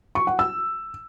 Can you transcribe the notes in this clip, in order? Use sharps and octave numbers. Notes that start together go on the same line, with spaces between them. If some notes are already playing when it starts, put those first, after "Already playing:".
C#6
F#5
E6